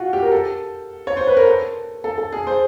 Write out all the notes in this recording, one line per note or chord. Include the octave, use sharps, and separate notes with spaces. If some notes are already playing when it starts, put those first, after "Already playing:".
Already playing: F4 F#4
G4
A#4
A4
C#5
C5
B4
A#4
A4
A4
A4
G#4
C5